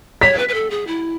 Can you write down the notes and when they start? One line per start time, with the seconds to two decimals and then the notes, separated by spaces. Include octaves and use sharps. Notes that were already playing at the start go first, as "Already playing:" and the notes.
0.21 C#5 B6
0.38 B4
0.48 B4
0.54 A4
0.70 G#4
0.87 E4